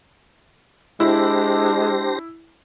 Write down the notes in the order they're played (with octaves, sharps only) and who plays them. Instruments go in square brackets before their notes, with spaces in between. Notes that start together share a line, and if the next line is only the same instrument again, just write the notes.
[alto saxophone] G#3 [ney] D4 [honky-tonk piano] E4 [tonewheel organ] G4 C5 A#6